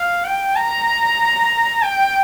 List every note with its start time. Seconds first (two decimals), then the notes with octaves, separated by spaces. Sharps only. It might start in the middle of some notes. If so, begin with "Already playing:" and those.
Already playing: F5
0.25 G5
0.56 A#5
1.82 G5